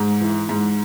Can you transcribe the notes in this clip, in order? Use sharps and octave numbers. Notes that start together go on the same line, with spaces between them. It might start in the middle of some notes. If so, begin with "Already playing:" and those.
Already playing: G#2
E3
G#2